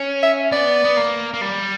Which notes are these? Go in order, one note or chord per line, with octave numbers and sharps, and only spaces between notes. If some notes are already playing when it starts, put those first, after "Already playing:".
Already playing: C#4
E5
B3 D5
B3
A#3
A#3
G3